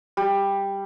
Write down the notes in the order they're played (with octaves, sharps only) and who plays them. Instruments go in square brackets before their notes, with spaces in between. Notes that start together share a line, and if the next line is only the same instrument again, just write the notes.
[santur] G3